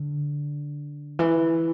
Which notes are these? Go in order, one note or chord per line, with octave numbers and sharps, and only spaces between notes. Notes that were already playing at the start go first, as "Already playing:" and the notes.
Already playing: D3
E3